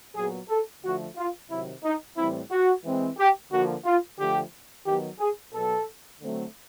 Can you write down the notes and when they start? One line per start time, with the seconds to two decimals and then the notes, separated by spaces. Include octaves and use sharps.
0.15 A#2 F#3 B3 G#4
0.49 A4
0.83 D3 F3 A3 F#4
1.17 F4
1.50 C3 D#3 F#3 E4
1.84 D#4
2.17 A2 E3 G3 C4 E4
2.51 F#4
2.85 E3 G#3 C4
3.18 G4
3.51 D3 F3 A#3 F#4
3.85 F4
4.19 D3 F3 A3 G4
4.86 D#3 F#3 B3 G4
5.19 G#4
5.53 B2 F#3 B3 A4
6.20 D3 F#3 A3 C4